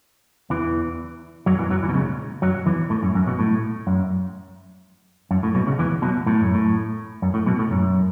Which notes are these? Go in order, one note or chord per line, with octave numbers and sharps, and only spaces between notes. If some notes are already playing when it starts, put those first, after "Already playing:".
E2 E3
F#2 F#3
E2 E3
F#2 F#3
E2 E3
B2
C#2 C#3
F#2 F#3
E2 E3
A2
F#2
F#2
B1 B2
A2
F#2
F#2
A2
B1 B2
C#2 C#3
E2 E3
B1 B2
A2
F#2
A2
F#2
A2
B1 B2
A2
F#2